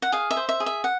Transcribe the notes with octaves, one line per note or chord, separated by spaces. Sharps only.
F#5
G#4 F5
E5
C5
E5
G#4
E5
F#5